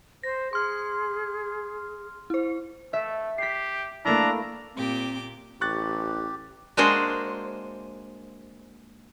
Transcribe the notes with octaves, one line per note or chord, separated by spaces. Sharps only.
C5 A#6
G#4 C6 F6
E4 C5
A3 E5
G4 B6 C7
A3 A#3 D4 E4 A#5
A#2 C4 G4 D6
A1 G4 C#6 F#6 A6
G#3 A#3 D4 F#4 G#4 C5